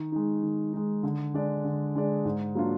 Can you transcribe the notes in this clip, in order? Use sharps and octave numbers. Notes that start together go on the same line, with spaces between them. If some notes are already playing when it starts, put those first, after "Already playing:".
Already playing: D#3
G#3 D#4
D#3
G#3 D#4
D3
G#3 D4 G#4 D5
D3
G#3 D4 G#4 D5
G#2
F#3 A#3 D4 F4